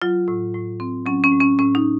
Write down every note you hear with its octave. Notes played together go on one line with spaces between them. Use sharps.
F#3 F4
A2
A2
C4
F#3 C#4
C#4
A2
C#4
A2 C#4
D#4